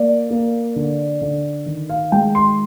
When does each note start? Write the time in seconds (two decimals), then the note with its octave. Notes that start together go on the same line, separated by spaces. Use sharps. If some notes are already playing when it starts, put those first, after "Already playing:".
Already playing: A#3 D5
0.31 A#3
0.76 D3
1.22 D3
1.66 D#3
1.89 F5
2.12 G#3 G5
2.35 C6